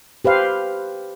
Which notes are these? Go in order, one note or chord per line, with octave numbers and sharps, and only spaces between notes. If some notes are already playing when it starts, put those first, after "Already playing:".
G4 B4 C5 F5